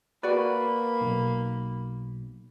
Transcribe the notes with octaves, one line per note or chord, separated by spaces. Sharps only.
A#3 F#4 B4 D5 B5
B1